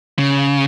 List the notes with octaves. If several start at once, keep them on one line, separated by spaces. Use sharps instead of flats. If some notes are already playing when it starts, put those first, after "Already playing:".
C#3